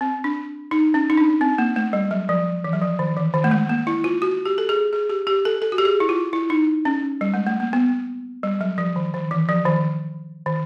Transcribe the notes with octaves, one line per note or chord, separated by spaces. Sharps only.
C4
D4
D#4
C#4
D#4
D4
C4
A#3
A3
G3
F#3
F3
E3
F#3
F3
D#3
E3
D#3
A3
G#3
A#3
E4
F4
F#4
G4
A4
G#4
G#4
G4
G4
A4
A4
F#4
G4
G#4
E4
F4
E4
D#4
C#4
G3
G#3
A3
A#3
B3
G3
F#3
F3
D#3
D#3
E3
F3
D#3
D#3